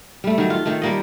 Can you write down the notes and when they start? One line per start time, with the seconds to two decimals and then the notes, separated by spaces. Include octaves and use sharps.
0.24 G3 A3
0.38 D#3 F#3
0.50 F4
0.65 D#3 A3
0.82 G3 A#3 D#5